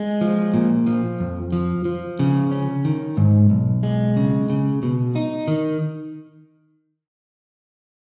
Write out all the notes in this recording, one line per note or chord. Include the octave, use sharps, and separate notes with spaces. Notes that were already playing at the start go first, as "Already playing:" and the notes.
Already playing: G#3
F3
A#2
F3
F2
F3
F3
C#3
C#4
D#3
G#2
B1
G#3
C#3
C#3
B2
D#4
D#3